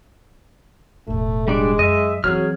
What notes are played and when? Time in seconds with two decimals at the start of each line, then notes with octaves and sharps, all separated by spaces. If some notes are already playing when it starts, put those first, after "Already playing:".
1.07 E1 A1 A3
1.48 G3 G#3 D4 D5
1.79 F#2 D#5 E5
2.24 E3 F#3 C4 G#4 C#5 F6